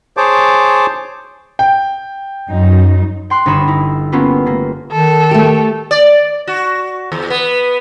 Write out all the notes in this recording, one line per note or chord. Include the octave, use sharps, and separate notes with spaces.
G#4 C5 C#5 A5 D6
G5
F#2 D#4
G5 C6 F#6
G1 D#4 C#5 B5 D#7 E7
D#4 E4
A#3 B3 C#4 E4 F4 G4
A3 A#3
D#3 A4
A3 G4
D5
F#4
E2
B3